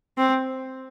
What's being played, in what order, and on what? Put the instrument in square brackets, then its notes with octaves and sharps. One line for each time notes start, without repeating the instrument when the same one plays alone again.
[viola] C4